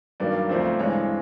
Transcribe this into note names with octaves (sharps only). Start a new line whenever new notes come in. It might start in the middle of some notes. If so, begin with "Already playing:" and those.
G2 D#3 F#3 A#3 D5
D2 C#3 F3 A3 C4
G2 E3 G#3 C4 C#5